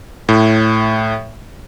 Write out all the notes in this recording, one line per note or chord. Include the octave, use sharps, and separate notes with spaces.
A2